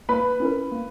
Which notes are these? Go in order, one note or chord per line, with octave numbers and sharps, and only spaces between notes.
A#3 B4 B5
C#4 E4 A#4
A#3